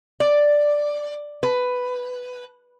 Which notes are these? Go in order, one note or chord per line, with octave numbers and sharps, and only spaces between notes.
D5
B4